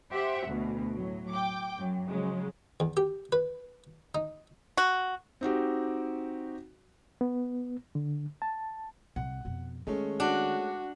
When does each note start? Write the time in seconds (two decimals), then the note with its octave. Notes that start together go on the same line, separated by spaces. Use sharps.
0.12 G4 C5 E5 F#5
0.48 D2 B2
0.94 A2 F#3
1.30 G5 D6
1.77 F#2 F#3
2.08 C#3 F3 F#3 G#3
2.80 E2
2.97 G4
3.32 B4
4.15 D#4
4.77 F#4
5.41 C4 D#4 F#4 G4
7.21 B3
7.95 D3
8.42 A5
9.16 C2 C3 F#5
9.45 F2 B2
9.87 D#3 G#3 A3 C#4
10.20 D4 F#4